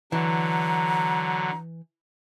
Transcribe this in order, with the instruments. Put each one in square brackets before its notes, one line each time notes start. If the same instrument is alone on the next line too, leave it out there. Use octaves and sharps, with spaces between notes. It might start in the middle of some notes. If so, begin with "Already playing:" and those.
[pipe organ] D3 F#3 [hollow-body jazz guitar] E3 [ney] A#5